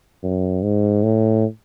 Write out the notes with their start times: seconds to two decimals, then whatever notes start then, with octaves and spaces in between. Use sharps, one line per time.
0.23 F#2
0.62 G#2
1.03 A2